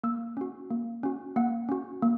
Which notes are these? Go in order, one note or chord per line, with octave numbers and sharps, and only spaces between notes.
A#3 E6
C#4 F#4
A#3
C#4 F#4
A#3 F#5
C#4 F#4
A#3